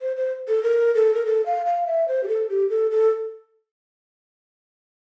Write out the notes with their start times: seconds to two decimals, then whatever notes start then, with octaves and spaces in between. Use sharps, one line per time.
0.01 C5
0.16 C5
0.48 A4
0.63 A#4
0.95 A4
1.15 A#4
1.25 A4
1.46 F5
1.66 F5
1.87 E5
2.08 C5
2.23 G4
2.28 A4
2.50 G4
2.70 A4
2.91 A4